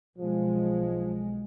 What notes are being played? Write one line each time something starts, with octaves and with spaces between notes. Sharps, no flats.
B1 F3 G#3